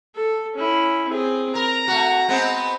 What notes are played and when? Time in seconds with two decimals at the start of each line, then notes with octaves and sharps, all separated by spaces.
0.15 A4
0.55 C#4 E4
1.09 C4 G#4
1.55 A#4 A#5
1.88 A3 F#4
2.29 G#3 B3 C4